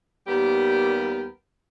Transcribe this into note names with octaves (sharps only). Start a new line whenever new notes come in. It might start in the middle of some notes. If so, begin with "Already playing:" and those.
D#2 G3 B3 G4 A#4